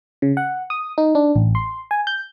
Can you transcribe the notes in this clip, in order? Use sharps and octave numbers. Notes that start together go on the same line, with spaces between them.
C#3
F#5
D#6
D#4
D4
A1
C6
G#5
G6